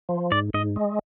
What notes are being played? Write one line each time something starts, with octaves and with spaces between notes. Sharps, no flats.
F3
G#2 D5
G#2 D#5
G#3